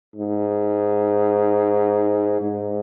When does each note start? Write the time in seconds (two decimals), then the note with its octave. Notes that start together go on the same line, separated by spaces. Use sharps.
0.16 G#2
2.41 G#2